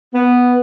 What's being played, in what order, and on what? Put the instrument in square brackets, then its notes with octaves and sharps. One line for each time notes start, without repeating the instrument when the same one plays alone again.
[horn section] B3